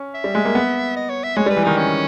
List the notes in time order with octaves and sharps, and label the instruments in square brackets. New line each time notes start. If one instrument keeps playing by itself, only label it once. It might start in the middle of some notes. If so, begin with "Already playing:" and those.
Already playing: [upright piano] C#4
[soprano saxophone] E5
[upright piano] G3
G#3
A#3
B3
[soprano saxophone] D#5
C#5
E5
[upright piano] G#3 [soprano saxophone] C#5
[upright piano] G3
[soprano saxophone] B4
[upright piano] E3
[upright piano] D#3 [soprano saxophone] D#4
[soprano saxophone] C#4